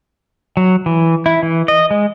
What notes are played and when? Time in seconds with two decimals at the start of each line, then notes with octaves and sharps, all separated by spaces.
0.57 F#3
0.86 E3
1.26 E4
1.43 E3
1.68 D#5
1.91 G#3